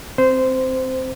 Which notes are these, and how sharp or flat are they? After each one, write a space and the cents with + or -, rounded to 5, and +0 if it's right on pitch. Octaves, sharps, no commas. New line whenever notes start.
C4 +0 C5 -15